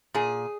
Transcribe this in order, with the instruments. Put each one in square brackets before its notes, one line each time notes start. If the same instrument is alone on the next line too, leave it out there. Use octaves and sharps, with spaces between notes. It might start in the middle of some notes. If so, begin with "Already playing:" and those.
[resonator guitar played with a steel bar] A#2 G#4